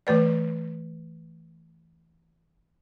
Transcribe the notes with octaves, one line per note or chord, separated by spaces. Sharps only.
E3 A3 B4 D5